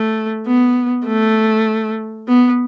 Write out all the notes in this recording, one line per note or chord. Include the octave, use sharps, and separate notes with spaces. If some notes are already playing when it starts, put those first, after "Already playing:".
Already playing: A3
B3
A3
B3